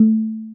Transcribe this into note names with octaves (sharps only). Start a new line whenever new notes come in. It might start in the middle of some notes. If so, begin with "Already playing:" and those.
Already playing: A3